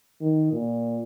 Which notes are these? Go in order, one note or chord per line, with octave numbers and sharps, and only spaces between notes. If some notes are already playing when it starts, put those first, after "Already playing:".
D#3
A#2